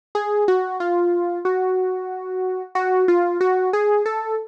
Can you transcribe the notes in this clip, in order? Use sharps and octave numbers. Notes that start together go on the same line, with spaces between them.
G#4
F#4
F4
F#4
F#4
F4
F#4
G#4
A4